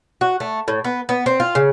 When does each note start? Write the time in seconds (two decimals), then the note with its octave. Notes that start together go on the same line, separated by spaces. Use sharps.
0.21 F#4
0.40 A3
0.68 A2
0.85 B3
1.09 B3
1.26 C4
1.40 F4
1.55 C#3